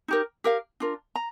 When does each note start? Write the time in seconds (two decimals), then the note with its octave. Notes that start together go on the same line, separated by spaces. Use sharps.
0.08 D#4 G4 A#4
0.44 G4 A#4 F5
0.80 D4 F4 A#4
1.16 A#5